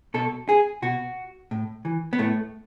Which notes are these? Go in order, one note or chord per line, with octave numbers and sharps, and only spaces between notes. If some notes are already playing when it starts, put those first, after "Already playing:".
B2 A4
G#4
B2 F#4
A2
E3
B3
A2 A3